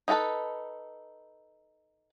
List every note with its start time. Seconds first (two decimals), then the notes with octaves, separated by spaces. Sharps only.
0.08 D#4 E4 F#4 A4 B4